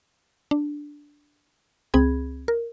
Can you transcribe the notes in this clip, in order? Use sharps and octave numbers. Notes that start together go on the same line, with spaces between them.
D4
C#2 C4 G#4 B5 G#6
A#4